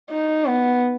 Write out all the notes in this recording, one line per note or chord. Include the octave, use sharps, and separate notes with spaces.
D#4
B3